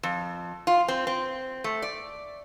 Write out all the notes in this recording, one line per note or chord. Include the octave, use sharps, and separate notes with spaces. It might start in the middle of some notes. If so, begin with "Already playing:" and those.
F2
F4
C4
C4
A3
D5